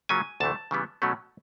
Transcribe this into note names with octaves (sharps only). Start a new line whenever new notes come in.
C#3 F#3 A#3 C#4 F4 G#5
D2 C3 E3 A3 A5
C#3 E3 G3 B3
B2 F#3 A3 C#4